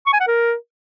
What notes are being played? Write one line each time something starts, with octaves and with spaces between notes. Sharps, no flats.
C#6
G#5
F#5
A#4